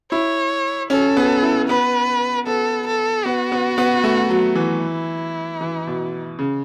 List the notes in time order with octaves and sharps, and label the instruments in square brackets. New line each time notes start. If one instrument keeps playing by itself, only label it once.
[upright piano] E4 [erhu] C#5
[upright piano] C#4 [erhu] A4
[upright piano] B3
E4
[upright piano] B3 [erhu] B4
[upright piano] B3 [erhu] A4
[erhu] A4
[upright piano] B3 [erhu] F#4
[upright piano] B3
B3
A3
F#3
E3
[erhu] E4
[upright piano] E3
B2
C#3